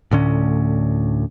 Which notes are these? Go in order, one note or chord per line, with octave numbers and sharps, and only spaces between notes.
D2 A2 D3 C#4